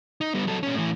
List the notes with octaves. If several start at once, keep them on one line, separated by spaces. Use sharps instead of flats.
D#4
G3 B3
F#3 A4
A#2 C#4
A2 E3